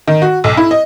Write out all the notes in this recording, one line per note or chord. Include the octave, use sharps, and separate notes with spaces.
D#3
F#4
B1
E4
D#5